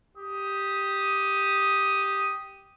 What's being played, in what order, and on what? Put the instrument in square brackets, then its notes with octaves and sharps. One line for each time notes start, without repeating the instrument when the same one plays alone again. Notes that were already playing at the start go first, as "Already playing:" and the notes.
[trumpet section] G4 D#6